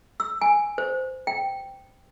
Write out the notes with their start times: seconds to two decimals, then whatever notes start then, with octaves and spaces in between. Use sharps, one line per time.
0.20 E6
0.41 G#5
0.78 C5
1.27 G5